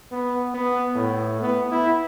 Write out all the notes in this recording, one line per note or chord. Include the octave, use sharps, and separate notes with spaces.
B3
B3
A2
B3
E4